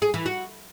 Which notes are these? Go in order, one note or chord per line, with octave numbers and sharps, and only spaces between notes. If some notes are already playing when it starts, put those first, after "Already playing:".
G#4
E3
F#4